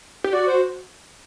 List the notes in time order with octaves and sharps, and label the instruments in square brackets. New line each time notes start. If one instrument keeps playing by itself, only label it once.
[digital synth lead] G4
[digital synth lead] F#4 [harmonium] D5
[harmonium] C5